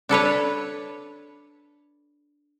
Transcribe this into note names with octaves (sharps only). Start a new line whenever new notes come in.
D4 A4 B4 C#5